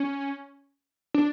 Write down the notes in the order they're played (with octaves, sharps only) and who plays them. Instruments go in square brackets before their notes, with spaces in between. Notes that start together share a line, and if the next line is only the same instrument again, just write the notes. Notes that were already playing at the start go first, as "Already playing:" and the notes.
Already playing: [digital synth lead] C#4
D4